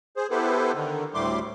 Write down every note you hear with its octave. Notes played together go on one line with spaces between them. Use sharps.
G#4 C5
B3 E4 G4 A4 B4 C5
D3 D#3
D2 A2 G3 A3 C6 D6